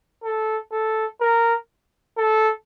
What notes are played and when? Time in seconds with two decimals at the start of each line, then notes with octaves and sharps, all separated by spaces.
0.24 A4
0.72 A4
1.21 A#4
2.17 A4